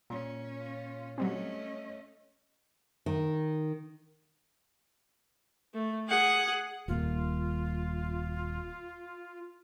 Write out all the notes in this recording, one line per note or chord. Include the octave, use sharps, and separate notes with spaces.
A#2 C#4
F4
F#3 G3 A3 C4 C#4 D#5
D#3
A3
G#4 F#5
D#1 A#2 F4